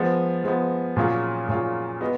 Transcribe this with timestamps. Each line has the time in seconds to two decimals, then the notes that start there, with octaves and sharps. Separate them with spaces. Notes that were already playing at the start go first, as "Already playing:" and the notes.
Already playing: F3 G#3 B3
0.44 F3 G#3 B3
0.96 A#2 F#3 C#4 F4 G#4
1.49 A#2 F#3 C#4 F4 G#4
2.01 G#3 B3 F#4 B4 D#5